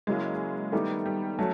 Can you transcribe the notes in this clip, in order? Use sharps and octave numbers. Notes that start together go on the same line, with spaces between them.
C#3 F#3 G#3 A#3 C#4 E4
D#3 G3 A3 B3 D#4 G4
G3
F#3 A3 C#4